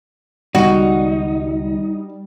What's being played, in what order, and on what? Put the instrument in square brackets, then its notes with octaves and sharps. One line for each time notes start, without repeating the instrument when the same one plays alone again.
[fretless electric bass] C#2 D#3 B3 [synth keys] G3 [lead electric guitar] D#4 [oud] F#4